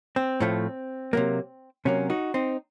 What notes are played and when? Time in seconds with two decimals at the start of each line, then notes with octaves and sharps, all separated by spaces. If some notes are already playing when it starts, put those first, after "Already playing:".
0.16 C4
0.40 A2 F3 A3
1.13 C3 F#3 A#3
1.85 C3 F#3 A#3 C#4
2.10 D#4 F#4
2.34 C4 D#4